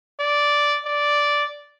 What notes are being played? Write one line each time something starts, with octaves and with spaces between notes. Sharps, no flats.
D5
D5